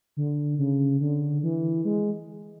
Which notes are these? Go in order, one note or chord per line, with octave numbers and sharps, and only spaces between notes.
D3
C#3
D3
E3
G#3